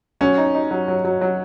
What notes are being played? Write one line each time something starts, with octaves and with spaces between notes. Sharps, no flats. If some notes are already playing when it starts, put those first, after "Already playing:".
F#3 C#4
D#4
D#4
F#3
F#3
F#3
F#3